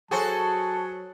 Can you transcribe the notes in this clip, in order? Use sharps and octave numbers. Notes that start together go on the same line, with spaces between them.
F#3 F#4 G#4 A4 C5 G#5 A5 C#6